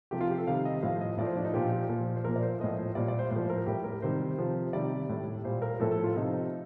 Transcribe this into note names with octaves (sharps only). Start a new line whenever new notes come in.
C3 F3 G4
F4
G4
A4
C3 D#3 G3 F5
D#5
A2 F3 F5
D#5
A2 F3 D5
C5
D4
D#4
A#2 F3 G4
G4
A#2 F3
C5
A#2 F3 A#4
D5
C5
A2 F3 D#5
C5
A#2 G3 D5
D5
C5
A2 F3 C5
A#4
A2 G3 G4
A#4
C3 D#3 G3 C5
C3 F3
C3 D#3 G3 D5
A2 G3
A#2 G3 C5
A#4
A2 F3 A4
A4
F4
C3 F3 D#4